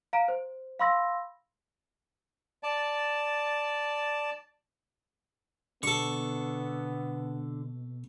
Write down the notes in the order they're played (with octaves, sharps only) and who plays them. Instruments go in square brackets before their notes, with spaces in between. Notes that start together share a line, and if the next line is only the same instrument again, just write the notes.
[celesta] F5 A#5 D7
C5
F5 B5 C6 E6 A#6
[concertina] D5 A5
[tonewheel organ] B2 [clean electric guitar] D3 [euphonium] B3 [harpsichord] A4 C#6